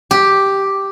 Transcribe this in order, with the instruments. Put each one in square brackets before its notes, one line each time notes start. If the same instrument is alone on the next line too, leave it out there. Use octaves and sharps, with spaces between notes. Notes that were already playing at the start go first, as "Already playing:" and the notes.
[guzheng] G4